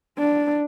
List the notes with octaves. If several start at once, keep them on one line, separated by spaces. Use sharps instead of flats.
D4